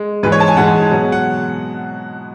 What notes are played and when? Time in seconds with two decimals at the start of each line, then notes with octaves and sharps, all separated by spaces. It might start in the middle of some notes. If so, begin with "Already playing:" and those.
Already playing: G#3
0.23 G#2 E3 G#3 B4
0.32 C#5
0.40 A5
0.48 G#5
0.57 G#2 E3 G#3 F#5
0.91 B2 F#3
1.12 F#5